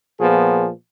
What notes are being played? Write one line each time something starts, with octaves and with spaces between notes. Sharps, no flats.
A#2 F3 B3 G#4